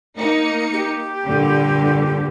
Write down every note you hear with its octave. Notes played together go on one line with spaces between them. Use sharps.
A#3 D#4 C#7
G4
G2 A#2 D3